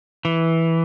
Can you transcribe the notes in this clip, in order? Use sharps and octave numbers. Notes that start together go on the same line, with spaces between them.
E3